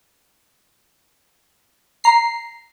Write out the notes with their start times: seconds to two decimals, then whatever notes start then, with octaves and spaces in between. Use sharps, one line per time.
2.04 A#5 C7